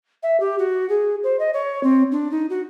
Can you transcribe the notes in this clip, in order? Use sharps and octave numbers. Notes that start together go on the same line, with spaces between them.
E5
G4
F#4
G#4
C5
D#5
C#5
C4
D4
D#4
F#4